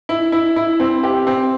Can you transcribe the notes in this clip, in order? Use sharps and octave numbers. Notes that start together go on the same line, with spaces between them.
E4
E4
E4
C4
G4
C4